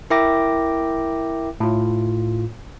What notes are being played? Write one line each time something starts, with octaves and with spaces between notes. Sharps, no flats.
E4 A#4 E5 G5 D6 A#6
A2 F4